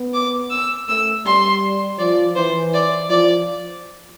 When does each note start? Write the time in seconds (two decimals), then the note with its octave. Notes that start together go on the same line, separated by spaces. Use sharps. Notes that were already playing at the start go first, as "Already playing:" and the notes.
Already playing: B3
0.14 D6
0.50 E6
0.88 A3 E6
1.25 G3 C6
1.99 F3 D5
2.36 E3 C5
2.74 D5
3.10 F3 D5